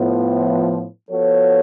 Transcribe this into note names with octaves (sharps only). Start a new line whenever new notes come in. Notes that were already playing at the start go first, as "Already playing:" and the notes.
Already playing: A2 F3 B3
F3 B3 F#4 A4 C#5